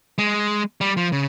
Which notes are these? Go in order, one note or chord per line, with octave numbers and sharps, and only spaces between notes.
G#3
G3
F3
C#3